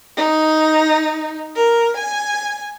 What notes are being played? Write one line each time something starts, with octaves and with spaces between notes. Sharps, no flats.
D#4
A#4
G#5